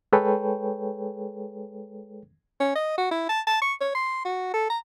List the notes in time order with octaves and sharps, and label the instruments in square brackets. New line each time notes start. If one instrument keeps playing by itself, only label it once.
[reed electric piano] G#3 G#4 A4 B4 C#5 G5
[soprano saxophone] C#4
D#5
F#4
E4
A5
A5
C#6
C#5
C6
F#4
A4
A#5